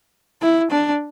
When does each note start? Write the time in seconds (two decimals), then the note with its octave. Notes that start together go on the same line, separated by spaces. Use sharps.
0.41 E4
0.71 D4